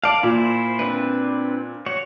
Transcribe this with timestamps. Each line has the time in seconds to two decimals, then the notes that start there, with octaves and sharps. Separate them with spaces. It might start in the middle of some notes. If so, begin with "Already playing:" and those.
0.04 D5 F5 A5
0.23 A#2 E4 C5
0.79 C4 D4 B4
1.86 F#4 C#5